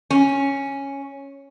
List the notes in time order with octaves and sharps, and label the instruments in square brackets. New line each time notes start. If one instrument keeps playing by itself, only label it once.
[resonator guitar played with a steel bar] C#4